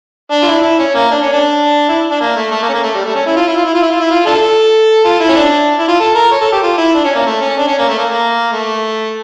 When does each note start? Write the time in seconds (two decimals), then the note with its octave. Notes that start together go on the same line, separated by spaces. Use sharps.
0.31 D4
0.42 F4
0.47 E4
0.62 E4
0.78 C#4
0.95 A#3
1.11 D4
1.21 C#4
1.32 D4
1.88 E4
2.10 D4
2.20 A#3
2.36 A3
2.52 A3
2.62 A#3
2.69 C#4
2.73 A#3
2.83 A3
2.94 G3
3.05 A3
3.15 C#4
3.26 E4
3.36 F4
3.47 E4
3.56 F4
3.65 E4
3.74 F4
3.82 E4
3.91 F4
4.00 E4
4.10 F4
4.26 D4 F4 A4
5.04 F4
5.20 E4
5.29 C#4
5.36 D4
5.79 E4
5.88 F4
6.00 A4
6.15 A#4
6.32 C#5
6.41 A4
6.52 G4
6.63 F4
6.78 E4
6.95 D4
7.05 C#4
7.15 A#3
7.26 A3
7.41 C#4
7.58 D4
7.67 C#4
7.79 A#3
7.88 A3
7.99 A#3
8.10 A#3
8.52 A3